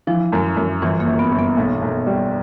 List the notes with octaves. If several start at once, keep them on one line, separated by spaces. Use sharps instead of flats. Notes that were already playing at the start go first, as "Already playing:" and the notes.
E3 F3
F#2
F#2
G1 E3
A#3
G1
B3
G1
B3
B1
B1
G3